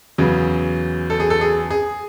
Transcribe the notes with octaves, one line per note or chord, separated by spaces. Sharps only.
E2 C#3 F#3
A4
G#4
A4
G#4
G#4